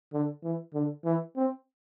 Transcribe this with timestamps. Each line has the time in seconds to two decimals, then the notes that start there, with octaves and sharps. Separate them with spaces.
0.13 D3
0.43 E3
0.74 D3
1.05 E3
1.36 C4